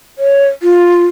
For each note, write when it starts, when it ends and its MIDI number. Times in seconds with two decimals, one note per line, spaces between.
0.18 0.46 73
0.62 1.05 65